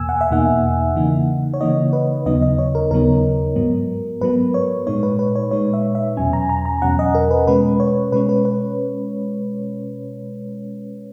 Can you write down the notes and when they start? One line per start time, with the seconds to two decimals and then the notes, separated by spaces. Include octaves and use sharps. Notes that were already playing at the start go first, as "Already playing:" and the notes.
Already playing: E2 B2 A#3 G#5 E6
0.09 F#5
0.21 E5
0.31 E2 B2 A#3 D#4 F#5
0.95 C#3 E3 A#3 D#4
1.54 C#5
1.61 C#3 E3 A#3 D#4 D#5
1.93 B4
2.26 D#2 C#3 F#3 B3 D#4 D#5
2.42 D#5
2.59 C#5
2.75 A#4
2.91 D#2 C#3 F#3 B3 D#4 A#4
3.56 G#2 F#3 B3
4.21 G#2 F#3 B3 B4
4.54 C#5
4.87 A#2 G#3 D#4 C#5
5.03 B4
5.19 B4
5.35 C#5
5.51 A#2 G#3 D#4 C#5
5.73 E5
5.95 E5
6.17 E2 B2 F#3 C#4 G#5
6.33 A#5
6.49 A#5
6.65 A#5
6.82 E2 B2 F#3 C#4 F#5
6.99 D#5
7.15 A#4
7.31 B4
7.47 B2 G#3 C#4 B4
7.80 C#5
8.12 B2 G#3 C#4 B4
8.29 B4
8.45 B4